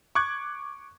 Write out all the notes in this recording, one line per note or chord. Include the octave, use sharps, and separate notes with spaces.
C#6 D6 F#6 G#6